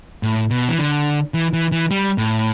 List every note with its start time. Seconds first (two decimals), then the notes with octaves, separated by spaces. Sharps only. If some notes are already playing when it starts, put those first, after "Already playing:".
0.23 A2
0.51 B2
0.69 E3
0.79 D3
1.34 E3
1.53 E3
1.72 E3
1.91 G3
2.18 A2